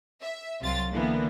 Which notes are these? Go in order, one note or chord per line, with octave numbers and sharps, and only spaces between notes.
E5
C2 C3 F#3 F4 A6
D3 E3 A#3 B3